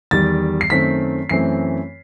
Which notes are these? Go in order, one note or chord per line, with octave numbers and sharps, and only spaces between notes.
E2 D#3 G3 A6
C7
F#2 D#3 A3 C4 B6
F#2 E3 A3 C4 C7